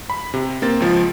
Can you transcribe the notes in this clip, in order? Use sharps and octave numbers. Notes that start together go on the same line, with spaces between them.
B5
C3
A#3 C4 A6
C#2 F3